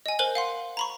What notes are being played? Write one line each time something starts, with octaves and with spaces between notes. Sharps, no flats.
D#5 G#5
A#4 C5 G#5 F#6 F#7 G7
F5 F#5 C6
A#5 B5 C#6